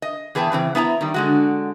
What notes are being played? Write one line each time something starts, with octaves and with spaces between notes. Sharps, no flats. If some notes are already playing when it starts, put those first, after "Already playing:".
D#5
E2 G#4 B4 G5 A5
C#3 E3 C4
B3 E4 G#5 A#5
D#3 G3
D3 G#3 F#4